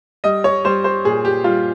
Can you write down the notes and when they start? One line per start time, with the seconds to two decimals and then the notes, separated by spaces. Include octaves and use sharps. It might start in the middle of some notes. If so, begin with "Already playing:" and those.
0.24 G3 D#5
0.44 C#5
0.64 G3 C5
0.84 C5
1.05 A#2 G#4
1.25 G4
1.44 G3 F4